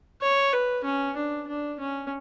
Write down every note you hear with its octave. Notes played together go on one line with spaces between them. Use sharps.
C#5
B4
C#4
D4
D4
C#4